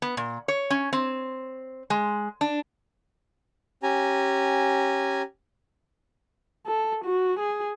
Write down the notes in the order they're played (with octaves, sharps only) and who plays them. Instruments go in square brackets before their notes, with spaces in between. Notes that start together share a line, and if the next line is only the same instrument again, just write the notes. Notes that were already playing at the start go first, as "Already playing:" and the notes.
[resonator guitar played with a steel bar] B3
A#2
C#5
C#4
C4
G#3
D4
[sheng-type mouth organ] C#4 G4 G#5 A#5
[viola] A4
F#4
G#4